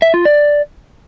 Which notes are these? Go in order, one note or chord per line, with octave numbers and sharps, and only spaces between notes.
E5
F4
D5